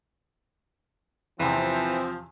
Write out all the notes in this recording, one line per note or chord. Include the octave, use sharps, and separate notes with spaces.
E2 C3 E3 F3 C4